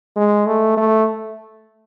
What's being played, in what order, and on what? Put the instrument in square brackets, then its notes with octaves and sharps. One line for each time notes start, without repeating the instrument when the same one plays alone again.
[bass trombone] G#3
A3
A3